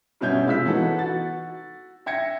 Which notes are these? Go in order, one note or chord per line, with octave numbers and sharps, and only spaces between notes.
G2 B2 C#4 E5 G6 G#6
C3 G#3 F4 E6 B6
E3 B3 D#4 F#4 A4
F#4 A6
E5 G5 G#6 A#6 C#7